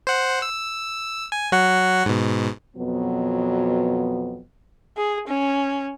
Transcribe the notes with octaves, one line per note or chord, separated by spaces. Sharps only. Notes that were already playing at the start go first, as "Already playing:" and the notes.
C5 F#5
E6
G#5
F#3 F#4 F#5
G#2 B2
F2 B2 F#3 B3
G#4
C#4